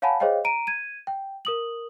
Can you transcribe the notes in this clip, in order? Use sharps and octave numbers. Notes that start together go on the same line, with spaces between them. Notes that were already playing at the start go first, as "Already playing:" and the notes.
C#5 F5 F#5 G#5 A5 B5
G#4 C5 C#5 D#5 F5 G5
A#5 D7 D#7
G#6 D#7
G5
A#4 D#6 F#7